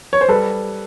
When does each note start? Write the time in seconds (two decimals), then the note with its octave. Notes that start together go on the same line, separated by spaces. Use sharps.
0.13 C#5
0.21 C5
0.28 G3 A4 B4